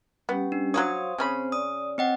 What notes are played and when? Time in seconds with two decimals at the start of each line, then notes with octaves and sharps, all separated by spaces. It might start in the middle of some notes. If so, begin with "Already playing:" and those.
0.29 G3 B3 C#4 G4
0.52 D4
0.74 F#3 A#3 C5 C#5 F5 C6 D#6
1.18 C#3 C4 C#4 C5 B5
1.52 D5 D#6
1.98 C4 C#5 D#5 F#5 G5